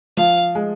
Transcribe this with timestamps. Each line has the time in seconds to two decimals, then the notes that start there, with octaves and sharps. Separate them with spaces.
0.17 F3 F5
0.55 G#3